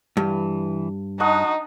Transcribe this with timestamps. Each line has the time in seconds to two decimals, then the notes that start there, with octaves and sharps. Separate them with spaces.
0.17 G2 E3
1.20 D4 D#4 F#4 D#5 F#5 C#6 F#6